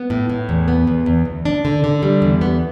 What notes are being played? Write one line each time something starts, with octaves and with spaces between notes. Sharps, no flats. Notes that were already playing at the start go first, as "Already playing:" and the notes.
Already playing: B3
A2
A2
E2
B3
E2
E2
D2
D4
D3
D3
G3
E2
B3